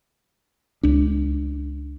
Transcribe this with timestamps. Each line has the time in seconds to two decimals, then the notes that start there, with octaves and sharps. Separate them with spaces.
0.83 C#2 D4